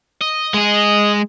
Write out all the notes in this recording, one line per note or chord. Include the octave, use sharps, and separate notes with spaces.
D#5
G#3 G#4